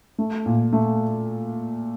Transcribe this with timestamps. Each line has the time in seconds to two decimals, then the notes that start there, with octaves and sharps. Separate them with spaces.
0.18 A3
0.46 A#2
0.73 A3